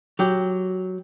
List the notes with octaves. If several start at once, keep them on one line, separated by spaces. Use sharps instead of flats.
F#3 G4